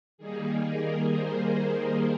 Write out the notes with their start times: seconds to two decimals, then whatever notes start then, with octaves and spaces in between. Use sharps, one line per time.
0.18 D#3 G3 A#3 D#4 G#4
0.63 A#4
1.09 C5